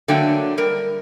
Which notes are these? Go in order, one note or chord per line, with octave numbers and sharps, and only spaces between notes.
D3 F#3 A3 A#3 D4 G5
G3 A#4